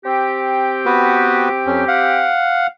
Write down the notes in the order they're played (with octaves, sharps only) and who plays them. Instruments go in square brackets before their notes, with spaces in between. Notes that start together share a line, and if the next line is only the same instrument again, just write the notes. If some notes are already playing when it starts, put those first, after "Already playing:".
[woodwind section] C4 G4 G5
[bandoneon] B3 F#4 B4
F2 C#4
F5 F#5